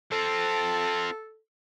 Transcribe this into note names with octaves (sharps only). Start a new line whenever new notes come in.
C4 F4 A4 A5